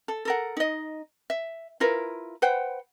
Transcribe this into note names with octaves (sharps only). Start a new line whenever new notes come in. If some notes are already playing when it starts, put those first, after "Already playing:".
A4
A4 A#4 F#5
D#4 D#5
E5
E4 F4 A#4 B4
B4 C5 F#5 G5